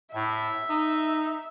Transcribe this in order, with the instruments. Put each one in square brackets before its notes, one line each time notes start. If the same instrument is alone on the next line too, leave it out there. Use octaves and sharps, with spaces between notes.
[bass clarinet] A2 [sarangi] E5
[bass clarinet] D#4